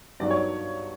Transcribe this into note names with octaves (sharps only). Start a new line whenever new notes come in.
G2 D#3 F#3 B3 D5
C#5